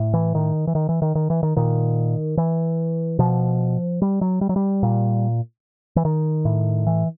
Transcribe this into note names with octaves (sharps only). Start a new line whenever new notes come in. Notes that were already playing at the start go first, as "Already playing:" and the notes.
Already playing: A2
E3
D#3
E3
D#3
E3
D#3
D#3
E3
D#3
A#2 D#3
E3
B2 F3
G3
F#3
G3
F#3
G3
A#2
E3
D#3
A2
E3